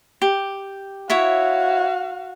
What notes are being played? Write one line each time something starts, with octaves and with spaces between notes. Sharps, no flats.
G4
E4 F#4 C#5 E5 F5